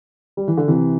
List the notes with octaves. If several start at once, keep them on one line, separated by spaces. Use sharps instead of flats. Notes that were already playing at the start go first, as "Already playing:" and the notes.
G3
E3
D3
C3 E3